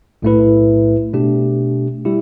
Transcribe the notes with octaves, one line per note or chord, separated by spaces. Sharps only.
B1 A2 A3 E4 B4
B2 A3 D4 G4
G3 E4 G4